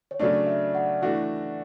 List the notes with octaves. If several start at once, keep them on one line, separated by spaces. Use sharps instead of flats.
C#5
C#3 F#3 A3 D4 D5
E5
F#5
E3 A3 D4 F#4